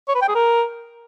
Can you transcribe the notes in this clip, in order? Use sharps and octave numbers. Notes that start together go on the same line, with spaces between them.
C#5
B4
G5
G#4
A#4